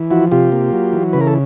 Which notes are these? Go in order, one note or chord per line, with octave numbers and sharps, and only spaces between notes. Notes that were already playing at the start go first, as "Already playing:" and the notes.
Already playing: E3
F3 E4 F#4
C3 F4 G4
A#3
F#3
E3
C#3 B4
A#4
A4